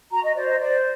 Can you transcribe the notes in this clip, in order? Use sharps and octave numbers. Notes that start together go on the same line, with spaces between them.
F#4 A#5
D#5
C5 D5
D#5
C5 D5